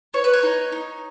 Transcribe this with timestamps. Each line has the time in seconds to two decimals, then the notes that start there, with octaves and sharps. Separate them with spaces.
0.14 B3 C#5
0.24 B4
0.33 C#5
0.43 D#4
0.72 D#4